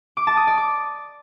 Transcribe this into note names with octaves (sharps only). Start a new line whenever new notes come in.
D6
A5
D#6
D5
D6